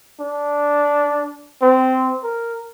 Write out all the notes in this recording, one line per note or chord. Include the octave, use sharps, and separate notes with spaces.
D4
C4
A#4